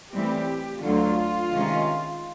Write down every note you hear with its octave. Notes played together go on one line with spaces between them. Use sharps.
A2 E3 G3 C4 G4
D2 D3 F#3 F4
C3 D#3 G#3 C#4